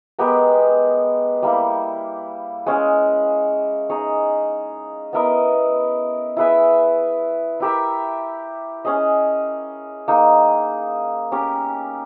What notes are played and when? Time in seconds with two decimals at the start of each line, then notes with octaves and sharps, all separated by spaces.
0.19 G#3 B3 G4 A#4
1.42 G3 A#3 E4
2.66 G#3 C#4 G#4
3.90 D#4 G#4 C#5
5.13 B3 E4 A#4 D#5
6.37 E4 G#4 B4 E5
7.60 E4 G4 A#4 E5
8.85 C#4 G#4 D#5
10.08 A#3 D#4 G#4
11.32 C#4 G4 A#4